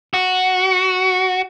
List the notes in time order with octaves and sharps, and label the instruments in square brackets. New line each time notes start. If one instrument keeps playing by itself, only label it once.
[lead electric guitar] F#4